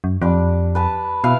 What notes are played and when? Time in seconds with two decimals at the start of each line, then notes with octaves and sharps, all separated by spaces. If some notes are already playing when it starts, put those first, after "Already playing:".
0.04 F#2
0.22 F2 G3 D4
0.75 B4 A5 B5
1.24 B2 E4 B4 F5